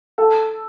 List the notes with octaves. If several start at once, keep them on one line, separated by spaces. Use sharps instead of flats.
A4